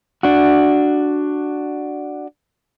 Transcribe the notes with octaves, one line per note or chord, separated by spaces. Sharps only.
D4 F#4